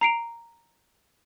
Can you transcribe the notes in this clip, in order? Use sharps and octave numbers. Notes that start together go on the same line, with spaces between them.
A#5 C7 D7 F7